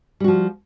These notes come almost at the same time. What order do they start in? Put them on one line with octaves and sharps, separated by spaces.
G3 F#4 F3